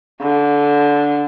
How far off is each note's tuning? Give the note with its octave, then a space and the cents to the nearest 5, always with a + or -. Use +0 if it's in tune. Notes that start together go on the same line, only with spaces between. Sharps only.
D3 -15